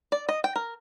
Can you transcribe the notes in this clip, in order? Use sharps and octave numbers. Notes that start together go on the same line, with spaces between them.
D5
D#5
G5
A#4